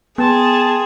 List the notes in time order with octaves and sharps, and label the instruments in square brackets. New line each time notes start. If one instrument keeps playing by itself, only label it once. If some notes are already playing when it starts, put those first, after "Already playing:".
[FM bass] B3 [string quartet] G#4 [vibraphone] G5 C6 [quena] A5